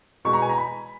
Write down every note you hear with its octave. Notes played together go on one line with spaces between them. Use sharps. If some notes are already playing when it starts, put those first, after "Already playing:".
B2 G#3 B3 C#6
A#5
G#5
A#5
B5